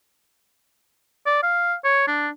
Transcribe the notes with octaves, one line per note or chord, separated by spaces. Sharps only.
D5
F5
C#5
D4